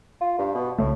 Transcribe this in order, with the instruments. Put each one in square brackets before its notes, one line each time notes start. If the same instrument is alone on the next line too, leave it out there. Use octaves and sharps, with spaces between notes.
[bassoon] F4
G2
B2
[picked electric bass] C2 C#3 A3 [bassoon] A2